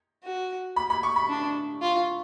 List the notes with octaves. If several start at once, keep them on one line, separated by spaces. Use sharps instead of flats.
F#4
B5
B5
C#6
B5
D4
F4